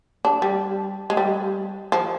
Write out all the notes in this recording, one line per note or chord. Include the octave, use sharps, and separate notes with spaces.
D4
G3
G#3
G3
F3